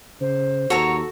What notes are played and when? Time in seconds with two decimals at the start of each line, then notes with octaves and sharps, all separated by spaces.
0.20 C#3 C5
0.70 D#2 F#4 A4 C#5 A#5